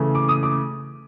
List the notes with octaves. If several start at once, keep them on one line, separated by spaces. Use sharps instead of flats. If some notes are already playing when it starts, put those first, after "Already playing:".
Already playing: C#3 E3 A3
D6
D#6
D6